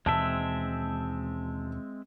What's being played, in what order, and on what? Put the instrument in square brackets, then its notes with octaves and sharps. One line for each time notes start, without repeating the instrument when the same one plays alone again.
[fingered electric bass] D#2 B2 E3 [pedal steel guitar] G#3 C4 E5 [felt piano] A5